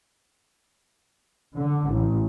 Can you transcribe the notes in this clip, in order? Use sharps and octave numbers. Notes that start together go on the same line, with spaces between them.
D3
A1